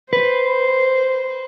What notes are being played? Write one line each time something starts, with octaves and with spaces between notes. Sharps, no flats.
B4 C5